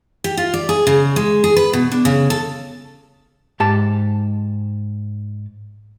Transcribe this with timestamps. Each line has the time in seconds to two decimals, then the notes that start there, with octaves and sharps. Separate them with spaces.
0.24 G4
0.37 F4
0.54 D5
0.69 G#4
0.87 C#3
1.16 G#3
1.44 G#4
1.56 B4
1.73 B2
1.92 D4
2.05 C#3
2.30 A4
3.60 G#2 G4 A5